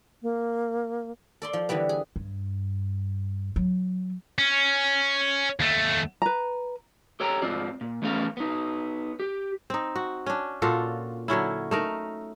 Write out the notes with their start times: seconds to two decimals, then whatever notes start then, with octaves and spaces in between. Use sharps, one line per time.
0.22 A#3
1.42 A4 D5 C6
1.53 F3
1.69 D3 E3 G3 B3
1.89 G#4
2.16 G2
3.56 F#3
4.38 C#4
5.60 D#2 A3
6.22 B4 A#5
7.20 G4 A4 C#5 G5 A#5
7.42 G#2 C4 F4 D5
7.81 A#2
8.02 E2 A3 B3 C#4 A4 F5
8.37 B3 D#4
9.20 G4
9.70 C4 D#4
9.96 F#4
10.26 C#4 D4
10.62 A#2 F4 F#4 A4
11.28 D3 F#3 C#4 E4
11.71 A3 D#4 A#4